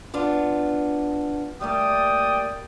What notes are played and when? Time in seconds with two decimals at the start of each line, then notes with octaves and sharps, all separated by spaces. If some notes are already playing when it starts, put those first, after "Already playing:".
0.14 B3 D4 F4
1.61 G3 A3 A#3 D5 G5 D#6